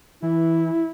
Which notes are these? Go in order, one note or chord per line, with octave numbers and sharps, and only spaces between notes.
E3 E4